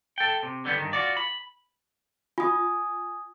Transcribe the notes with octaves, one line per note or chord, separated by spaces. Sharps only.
A4 G5
C3
D3 G3 B3
G2 D#3
F4 F#4 D5
B5
F4 G#5 D#6